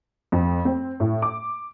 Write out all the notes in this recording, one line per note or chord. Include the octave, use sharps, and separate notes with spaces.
F2
C4
A2
D6